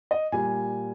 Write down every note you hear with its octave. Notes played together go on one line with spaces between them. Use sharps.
D#5
A#2 G3 G#5